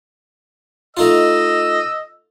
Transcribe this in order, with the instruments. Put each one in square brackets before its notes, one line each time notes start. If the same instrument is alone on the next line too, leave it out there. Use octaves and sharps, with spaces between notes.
[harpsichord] A3 D#4 F4 [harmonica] D#5 E6